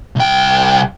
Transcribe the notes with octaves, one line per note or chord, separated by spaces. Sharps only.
C2 G5